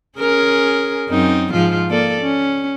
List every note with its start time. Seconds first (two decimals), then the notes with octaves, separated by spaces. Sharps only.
0.18 C#4 G#4 A#4
1.09 F#2 C4 D#4
1.53 G#2 F3 F4
1.89 A#3 A4 D5
2.22 C#4